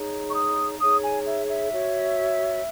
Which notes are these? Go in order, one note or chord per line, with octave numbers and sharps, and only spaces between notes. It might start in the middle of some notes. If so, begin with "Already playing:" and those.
Already playing: D#4 G#4 C#5
C#6
D#6
D#4 G#4 C#5 D#6
G#5
E5
E5
F#4 C#5